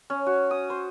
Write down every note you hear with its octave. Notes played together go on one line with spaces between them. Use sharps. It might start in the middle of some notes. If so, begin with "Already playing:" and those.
C#4
F#4
D#6
C5